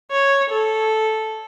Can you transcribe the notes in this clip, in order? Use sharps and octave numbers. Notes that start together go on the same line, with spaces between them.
C#5
A4